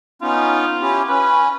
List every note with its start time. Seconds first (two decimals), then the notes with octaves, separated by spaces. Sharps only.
0.22 B3 C#4 D#4 F4
0.82 C#4 E4 G4
1.08 C#4 B4